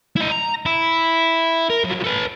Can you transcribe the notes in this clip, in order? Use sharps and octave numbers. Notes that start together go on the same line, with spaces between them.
E4 D#5
A#5
E4
A#4
F3 F#3
A4 B4